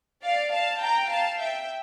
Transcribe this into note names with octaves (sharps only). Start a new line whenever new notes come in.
D5 F5
F5 A5
G5 A#5
F5 A5
E5 G5